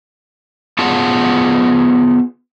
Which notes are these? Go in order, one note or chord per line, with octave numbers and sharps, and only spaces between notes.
B3 F4 G#4 F#5 A5